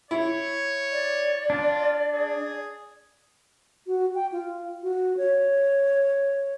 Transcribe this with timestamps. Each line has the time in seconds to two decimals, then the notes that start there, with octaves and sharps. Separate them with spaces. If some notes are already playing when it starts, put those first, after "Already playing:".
0.11 E4 C#5
0.92 D5
1.50 D4 F4
2.14 G#4
3.87 F#4
4.15 G5
4.32 F4
4.83 F#4
5.17 C#5